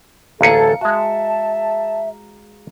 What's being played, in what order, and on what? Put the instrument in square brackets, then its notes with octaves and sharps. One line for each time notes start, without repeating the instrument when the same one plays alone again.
[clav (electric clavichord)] A1 D2 G#4 [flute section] A4 [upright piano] F5 A#5 C#7
[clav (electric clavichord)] G#3 F#4 [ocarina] E5 [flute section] A5